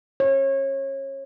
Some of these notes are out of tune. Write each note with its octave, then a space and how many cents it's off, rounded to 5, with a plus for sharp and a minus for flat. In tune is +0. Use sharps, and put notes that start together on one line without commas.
C#5 -30